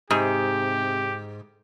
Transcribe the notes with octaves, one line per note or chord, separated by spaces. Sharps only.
G#2 C3 G4